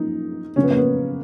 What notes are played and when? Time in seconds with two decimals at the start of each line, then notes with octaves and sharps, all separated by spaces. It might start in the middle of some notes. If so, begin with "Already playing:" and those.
Already playing: F#2 F3 A#3 D#4
0.56 F#1 F2 C#3 C#4
0.64 B3
0.70 A#3
0.77 B3